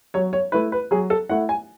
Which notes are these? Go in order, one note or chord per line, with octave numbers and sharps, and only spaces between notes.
F#3 C#5
C#5
A3 E4 B4
B4
F#3 G#4
A4
A3 E4 F#5
G#5